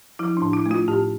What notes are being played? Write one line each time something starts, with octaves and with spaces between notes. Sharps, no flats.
F3 E4
A2 D4
E4
A3
F4
A2 G4